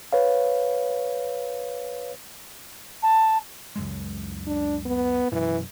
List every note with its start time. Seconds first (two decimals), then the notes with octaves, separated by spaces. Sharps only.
0.13 B4 C#5 F5
3.03 A5
3.76 C#2 F#2 G#3
4.47 D4
4.85 B3
5.32 F#2 B2 E3